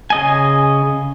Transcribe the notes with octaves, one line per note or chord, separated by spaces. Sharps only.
C#3 D#5 G#5